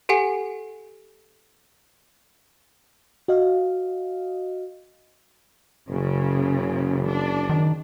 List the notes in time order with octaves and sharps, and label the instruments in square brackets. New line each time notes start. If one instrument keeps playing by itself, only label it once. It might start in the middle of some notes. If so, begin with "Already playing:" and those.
[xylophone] G4 A4 F#5 G#5 C7
[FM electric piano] F#4 D#5 F5
[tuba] F#1 [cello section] C#3
[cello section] D4
[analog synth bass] D#3